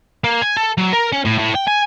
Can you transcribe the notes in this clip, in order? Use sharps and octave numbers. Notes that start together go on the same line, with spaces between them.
A#3
G#5
A4
F#3
A#4
C#4
A2
A2
G5
G#5